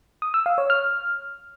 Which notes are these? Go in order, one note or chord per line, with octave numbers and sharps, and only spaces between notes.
D#6
E6
F5
C#5
F6